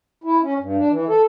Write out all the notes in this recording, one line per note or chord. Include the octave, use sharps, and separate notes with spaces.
E4
C#4
G2
D4
E3
A4